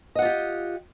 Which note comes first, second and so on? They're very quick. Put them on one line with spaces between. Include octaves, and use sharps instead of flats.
D#5 F#5 F4 G4